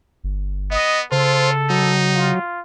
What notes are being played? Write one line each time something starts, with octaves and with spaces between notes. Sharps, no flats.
G1
B3 D#5
C#3 F4 A4 C5
F#3 D#4
F4